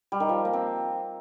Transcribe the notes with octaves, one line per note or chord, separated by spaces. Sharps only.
G3
D#3
F3
A#3
C4